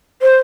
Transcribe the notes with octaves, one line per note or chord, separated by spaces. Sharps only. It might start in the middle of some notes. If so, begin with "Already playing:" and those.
C5